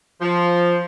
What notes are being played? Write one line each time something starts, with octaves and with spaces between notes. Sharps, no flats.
F3